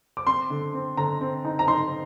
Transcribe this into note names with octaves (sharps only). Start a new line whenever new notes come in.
D6
C4 C6
D3
C4
D3 A#5
C4
D#4
A#5
D#4 C6